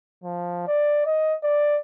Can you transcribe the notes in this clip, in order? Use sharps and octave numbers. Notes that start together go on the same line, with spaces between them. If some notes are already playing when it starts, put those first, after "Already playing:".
F3
D5
D#5
D5